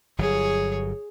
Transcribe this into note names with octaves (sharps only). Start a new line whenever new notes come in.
G1 F#3 G#4 C#5